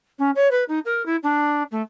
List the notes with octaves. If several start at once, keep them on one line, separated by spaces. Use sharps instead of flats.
C#4
C#5
B4
D#4
A#4
E4
D4
A3